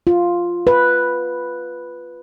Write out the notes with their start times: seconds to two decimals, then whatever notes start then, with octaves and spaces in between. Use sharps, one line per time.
0.07 F4
0.67 B4